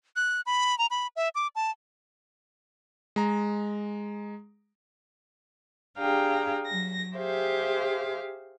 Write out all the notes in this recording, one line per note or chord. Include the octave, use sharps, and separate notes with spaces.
F#6
B5
A#5
B5
E5
D6
A5
G#3 A#5
D4 G4 G#4 F5 G5 A#5
F#3 A#6
G4 G#4 C5 E5 F5